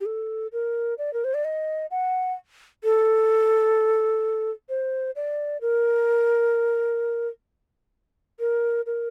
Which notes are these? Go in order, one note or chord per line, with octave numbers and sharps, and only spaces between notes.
G4
A4
A#4
D5
A#4
C5
D5
D#5
F#5
A4
C5
D5
A#4
A#4
A#4